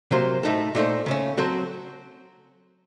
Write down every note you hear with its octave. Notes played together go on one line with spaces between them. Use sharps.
C3 F#3 A#3 F4 C5
A2 A3 D#4 A4
A#2 A3 D#4 A4 C5
C#3 A3 C#4
F#3 C4 F#4 A4 C5